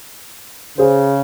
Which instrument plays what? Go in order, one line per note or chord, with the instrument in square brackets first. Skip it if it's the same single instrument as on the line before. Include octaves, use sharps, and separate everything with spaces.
[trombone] C#3 [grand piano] G#4 C5